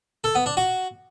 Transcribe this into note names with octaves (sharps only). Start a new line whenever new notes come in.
A4
B3
D4
F#4